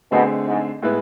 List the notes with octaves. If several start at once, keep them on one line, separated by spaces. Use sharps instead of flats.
B2 D3 A3 C4 G#4
G#2
A2 G#3 B3 E4 B4